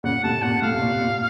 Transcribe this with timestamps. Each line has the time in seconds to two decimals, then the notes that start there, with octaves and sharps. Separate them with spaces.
0.04 A#2 C#3 F#5
0.23 A2 C3 A5
0.42 A#2 F#5
0.62 A2 F5
0.73 C3
0.82 A#2
1.01 A#2